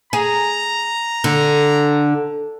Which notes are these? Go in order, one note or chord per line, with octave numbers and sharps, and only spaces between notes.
G#4 A#5
D3